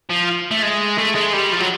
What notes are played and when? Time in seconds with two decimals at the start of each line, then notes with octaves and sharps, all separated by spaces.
0.09 F3
0.51 A3
0.62 G#3
0.98 A3
1.15 G#3
1.33 G3
1.53 F3
1.60 F#3